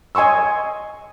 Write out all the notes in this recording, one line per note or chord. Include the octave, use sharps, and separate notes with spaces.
D#5 G#5 C6 C#6 E6